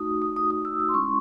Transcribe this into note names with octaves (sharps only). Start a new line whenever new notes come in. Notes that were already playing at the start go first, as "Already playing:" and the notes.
Already playing: A3 D#4 F#4 D#6
D#6
D#6
D#6
E6
D#6
C6
G#3 C#4 E4 C#6